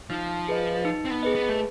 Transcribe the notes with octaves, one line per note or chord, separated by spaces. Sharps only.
F3 D#4
G#4 B4 D#5
D#4
C4
B3
G#4 B4 D#5
B3
A3